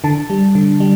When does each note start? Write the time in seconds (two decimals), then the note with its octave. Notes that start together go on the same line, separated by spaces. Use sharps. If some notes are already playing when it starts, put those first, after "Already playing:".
0.04 D3 A5
0.30 G3
0.55 D3
0.80 G3